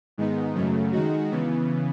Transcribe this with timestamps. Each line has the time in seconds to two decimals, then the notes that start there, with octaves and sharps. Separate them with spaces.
0.17 G#2 D#3 G#3 B3 D#4
0.55 F#2 C#3 F#3 A3
0.92 D#3 G#3 D#4 F#4
1.31 C#3 E3 B3